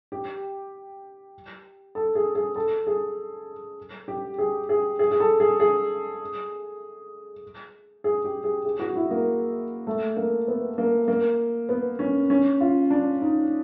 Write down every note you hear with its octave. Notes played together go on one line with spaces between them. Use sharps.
G4
A4
G#4
G#4
A4
G#4
G4
G#4
G#4
G#4
G#4
A4
G#4
G#4
G#4
G4
G#4
G#4
F#4
E4
A#3
A3
A#3
B3
A#3
A#3
B3
C#4
C#4
F4
D4
D#4